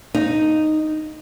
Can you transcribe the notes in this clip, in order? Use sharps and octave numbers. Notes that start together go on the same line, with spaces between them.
D#4